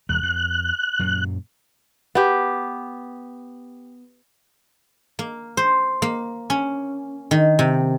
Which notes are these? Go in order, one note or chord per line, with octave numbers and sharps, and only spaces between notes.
F1 E2 G#3 F#6
F2
F#2 A#2 F#3
B3 G4
A#3
C5
A#3
C#4
D#3
C3